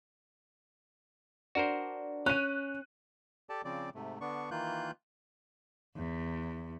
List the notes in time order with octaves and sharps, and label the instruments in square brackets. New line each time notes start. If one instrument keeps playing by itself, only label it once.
[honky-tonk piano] D4 [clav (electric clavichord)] F#4 A#4 C5
[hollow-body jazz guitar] C#4 [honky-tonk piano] F#6 D#7
[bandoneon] G4 A4 D5 A5
C#3 F3 C4 D5
G#2 C3 A3
D3 B3 D4 C#6
D#3 E3 A#3 F4 F#6 G6
[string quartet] E2